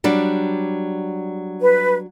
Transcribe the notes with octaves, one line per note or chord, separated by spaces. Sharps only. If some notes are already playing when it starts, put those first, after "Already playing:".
F#3 G3 D4
B4